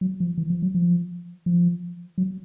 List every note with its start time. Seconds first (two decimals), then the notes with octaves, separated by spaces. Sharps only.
0.01 F#3
0.20 F3
0.38 E3
0.50 F3
0.62 F#3
0.74 F3
1.46 F3
2.18 F#3